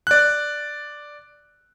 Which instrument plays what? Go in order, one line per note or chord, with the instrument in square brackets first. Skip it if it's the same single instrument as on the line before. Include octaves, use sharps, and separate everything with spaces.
[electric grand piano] D5 F#6